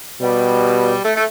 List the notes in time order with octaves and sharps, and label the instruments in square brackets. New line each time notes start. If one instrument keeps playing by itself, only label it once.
[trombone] B2 [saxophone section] G3
[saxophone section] A3
A3